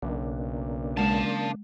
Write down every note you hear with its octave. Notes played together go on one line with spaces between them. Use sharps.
B1 C#3 A#3 D4
G#3 F5 A5